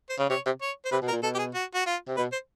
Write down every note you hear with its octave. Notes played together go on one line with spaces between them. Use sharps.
C5
C#3
C3 C#5
C3
C#5
C5
C3 B4
B2
A#4
A#2
B2 A4
G4
G#4
F#4
F#4
F4
C3
B2 B4
C5